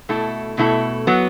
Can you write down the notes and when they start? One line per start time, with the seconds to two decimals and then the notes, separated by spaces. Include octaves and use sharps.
0.09 B2 A3 E4 A4
0.58 B2 A3 E4 A4
1.07 F#3 B3